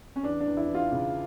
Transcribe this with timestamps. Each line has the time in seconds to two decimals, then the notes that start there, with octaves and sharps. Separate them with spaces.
0.16 C#4
0.23 E2 D4
0.41 D4
0.46 E2
0.57 E4
0.69 E3
0.75 F4
0.92 C#3